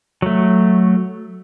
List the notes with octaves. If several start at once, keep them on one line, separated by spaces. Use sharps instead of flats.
F#3 A3